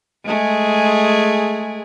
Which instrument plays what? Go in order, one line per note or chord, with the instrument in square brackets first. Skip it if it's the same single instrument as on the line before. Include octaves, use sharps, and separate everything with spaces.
[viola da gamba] G#3 A3 G#4